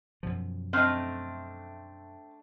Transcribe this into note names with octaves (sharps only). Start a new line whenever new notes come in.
F#2 B2 F3
A3 C4 D4 D#5 F6